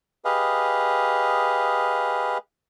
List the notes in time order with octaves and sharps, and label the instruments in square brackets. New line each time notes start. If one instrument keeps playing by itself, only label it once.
[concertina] G4 G#4 B4 D#5 F5